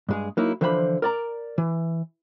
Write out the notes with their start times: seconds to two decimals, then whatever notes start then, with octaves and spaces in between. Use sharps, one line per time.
0.09 G2 G#3 G#4
0.37 F#3 A#3 D#4 E4
0.61 D3 E3 F3 C5 E5 B5
1.02 A#4 D5 A#5
1.58 E3